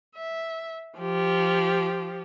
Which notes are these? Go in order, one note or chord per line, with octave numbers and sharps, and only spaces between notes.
E5
F3 G4